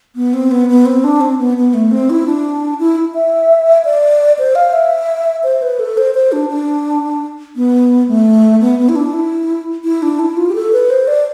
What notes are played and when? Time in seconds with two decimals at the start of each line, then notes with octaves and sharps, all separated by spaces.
0.16 B3
0.33 C4
0.51 B3
0.69 B3
0.85 C4
1.04 D4
1.21 C4
1.39 B3
1.57 B3
1.74 A3
1.91 C4
2.10 E4
2.26 D4
2.79 E4
3.14 E5
3.85 D5
4.38 C5
4.55 F5
4.73 E5
5.43 C5
5.62 B4
5.79 A4
5.97 C5
6.15 C5
6.32 D4
6.49 D4
7.56 B3
8.08 A3
8.60 B3
8.79 B3
8.89 E4
8.96 D4
9.13 E4
9.84 E4
10.02 D4
10.19 E4
10.37 F4
10.49 G4
10.55 A4
10.72 B4
10.90 C5
11.08 D5